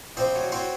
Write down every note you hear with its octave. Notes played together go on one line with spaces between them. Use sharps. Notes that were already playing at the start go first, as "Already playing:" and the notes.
A#1 C4 C5
F#3
F#3 C4 C5